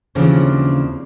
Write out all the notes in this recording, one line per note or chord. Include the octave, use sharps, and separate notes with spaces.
D#2 C#3 E3 F3 C4 D4